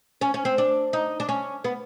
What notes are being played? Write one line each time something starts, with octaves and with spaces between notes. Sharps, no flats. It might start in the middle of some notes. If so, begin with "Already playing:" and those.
C#4
C#4
C4
D4
D#4
D4
C#4
B3